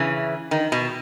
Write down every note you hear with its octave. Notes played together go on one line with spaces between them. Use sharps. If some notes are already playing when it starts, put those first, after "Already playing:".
Already playing: C#3 E3
D#3
B2